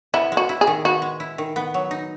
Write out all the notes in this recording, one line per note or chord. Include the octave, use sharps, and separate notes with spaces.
B3 E4
G#3
F#4
E4
G#4
D#3
B3 F#4
G#3
E4
D#3
B3
F#3
D#4